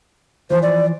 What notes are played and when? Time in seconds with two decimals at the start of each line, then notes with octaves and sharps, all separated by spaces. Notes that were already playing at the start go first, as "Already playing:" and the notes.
0.50 E3 F3 C5
0.62 D5